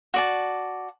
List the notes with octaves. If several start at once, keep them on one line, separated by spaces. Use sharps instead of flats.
F#4 D5 A5